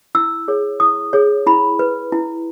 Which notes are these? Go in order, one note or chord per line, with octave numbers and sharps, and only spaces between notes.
E4 E6
G#4 C#5
E4 D#6
G#4 C#5
E4 B5
B4
E4